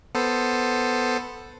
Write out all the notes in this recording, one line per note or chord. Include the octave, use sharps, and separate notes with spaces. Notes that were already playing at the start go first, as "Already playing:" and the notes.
B3 A4 C5